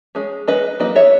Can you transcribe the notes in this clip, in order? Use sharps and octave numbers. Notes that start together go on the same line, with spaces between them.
G#3 C#4
G#3 C#4 B4 D#5
F#3 A#3 D#4 B4 D#5
C#5 E5